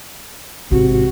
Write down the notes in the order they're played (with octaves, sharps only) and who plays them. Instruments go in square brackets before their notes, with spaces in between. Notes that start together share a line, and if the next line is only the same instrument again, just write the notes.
[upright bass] A1 G#2 [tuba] C3 [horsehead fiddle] F#4